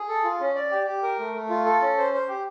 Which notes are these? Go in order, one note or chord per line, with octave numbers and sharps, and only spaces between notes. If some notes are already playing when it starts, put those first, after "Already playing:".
Already playing: G#4
A4
F4
C#4
D5
G4
G4
A#4
A3
A3
F4
A4
C#4
C5
C5
G4